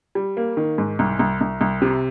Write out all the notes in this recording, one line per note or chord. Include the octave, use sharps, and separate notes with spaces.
G3
A#3
D#3
G#2
C2
C2
C2
C2
C3